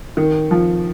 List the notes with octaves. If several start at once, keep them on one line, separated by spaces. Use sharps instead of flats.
D#3
F3